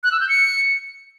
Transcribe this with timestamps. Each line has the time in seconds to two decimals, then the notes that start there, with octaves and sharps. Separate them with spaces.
0.04 F#6
0.12 E6
0.20 G6
0.29 C#7